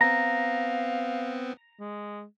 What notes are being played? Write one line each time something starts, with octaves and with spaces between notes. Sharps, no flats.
B3 C4 F5 A#5
G#3